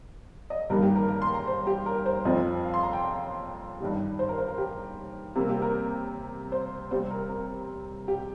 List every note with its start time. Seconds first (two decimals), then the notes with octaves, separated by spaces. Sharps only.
0.50 D#5
0.70 G2 D#3 G3 A#3 A#4
0.82 G4
0.96 A#4
1.09 A#4
1.22 C6
1.34 A#5
1.47 C5
1.67 G4
1.86 A#4
2.06 C5
2.25 F2 F3 C4 D#5
2.64 F5
2.74 C6
2.83 A#5
2.93 G5
3.03 F5
3.80 G2 D#3 G3
4.19 C5
4.29 A#4
4.38 C5
4.48 A#4
4.58 G4
5.35 C3 G3 A#3 A#4
5.49 G4
5.62 A#4
6.52 C5
6.91 C3 G3 C4 C5
7.11 A#4
7.30 A#4
8.08 G4